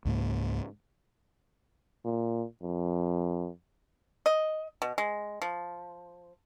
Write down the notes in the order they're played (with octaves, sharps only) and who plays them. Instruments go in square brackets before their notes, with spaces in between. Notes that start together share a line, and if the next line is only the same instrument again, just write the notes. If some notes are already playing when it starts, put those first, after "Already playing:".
[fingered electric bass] C#2 G#2 A#3
[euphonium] A#2
F2
[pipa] D#5
B2
G#3
F3